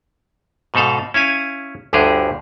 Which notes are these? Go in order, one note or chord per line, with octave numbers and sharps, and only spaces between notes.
G#2 B2 D#4 A4 F5
C#4 E4 F5 G#5
G1 D2 G2 D3 G4 G#4